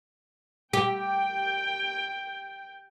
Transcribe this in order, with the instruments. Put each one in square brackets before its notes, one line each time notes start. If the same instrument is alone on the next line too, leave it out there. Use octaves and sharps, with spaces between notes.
[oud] G4 [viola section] G5